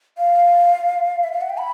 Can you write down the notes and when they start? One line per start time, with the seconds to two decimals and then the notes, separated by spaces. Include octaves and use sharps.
0.18 F5
1.24 E5
1.32 F5
1.41 F#5
1.49 G5
1.58 B5